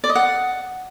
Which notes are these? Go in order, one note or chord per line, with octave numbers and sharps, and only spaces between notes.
D5
D#5
F#5